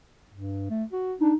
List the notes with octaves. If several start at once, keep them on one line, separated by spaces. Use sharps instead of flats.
G2
A3
F#4
D4 D#4